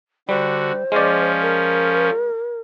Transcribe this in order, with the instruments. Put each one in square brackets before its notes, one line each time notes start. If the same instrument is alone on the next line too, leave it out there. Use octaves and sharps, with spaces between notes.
[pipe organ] D3 F#4 [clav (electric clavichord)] G3 [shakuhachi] C5
[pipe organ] F3 C#4 [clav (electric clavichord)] G#3 D5
[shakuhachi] A#4